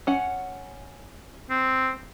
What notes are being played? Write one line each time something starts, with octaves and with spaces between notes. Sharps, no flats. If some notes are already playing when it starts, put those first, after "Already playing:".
C#4 F#5
C4